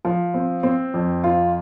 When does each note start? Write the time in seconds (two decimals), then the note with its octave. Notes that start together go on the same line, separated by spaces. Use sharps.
0.05 F3
0.34 C4
0.63 C4
0.94 F2
1.24 F4